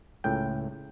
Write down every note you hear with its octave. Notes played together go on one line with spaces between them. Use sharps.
C#2 A2 G5